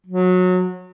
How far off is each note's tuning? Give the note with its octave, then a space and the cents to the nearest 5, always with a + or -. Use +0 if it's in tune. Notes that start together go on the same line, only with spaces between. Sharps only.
F#3 -20